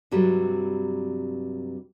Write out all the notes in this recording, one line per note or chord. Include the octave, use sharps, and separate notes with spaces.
G2 C3 F#3 G3 A3